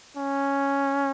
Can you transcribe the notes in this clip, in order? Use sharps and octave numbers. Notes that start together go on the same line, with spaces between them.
C#4